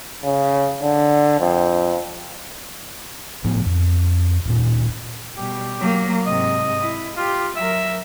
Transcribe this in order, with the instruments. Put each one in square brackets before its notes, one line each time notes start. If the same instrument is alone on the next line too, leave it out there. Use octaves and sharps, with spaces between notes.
[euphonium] C#3
D3
F2
[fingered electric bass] A2 F3 A3 B3
F2
D1 A#2
[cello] B2 G3 [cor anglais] G4
[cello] F#3 A#3
[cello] G#2 C3 [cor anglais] D#5
[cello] E4
[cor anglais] F4 [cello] G4
[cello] F#3 A#4 [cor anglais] E5